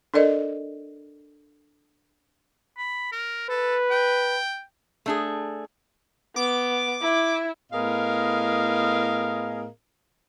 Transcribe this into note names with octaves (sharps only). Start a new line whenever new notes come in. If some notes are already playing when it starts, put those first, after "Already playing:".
D4 A4 A#4 D5 D#5
B5
A#4
A4 B4
G5
A3 D4 G#4
B3 D6
E4
A2 B3 G#4 A#4 D#5 F5